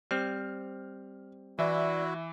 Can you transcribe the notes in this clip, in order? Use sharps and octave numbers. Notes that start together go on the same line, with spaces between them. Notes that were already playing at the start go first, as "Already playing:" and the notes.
G3 C4 F6
E3 E4 F#4 D5 E5